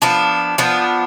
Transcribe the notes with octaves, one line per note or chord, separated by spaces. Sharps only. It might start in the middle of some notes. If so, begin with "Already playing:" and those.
F3 B3 D4
F3 B3 D4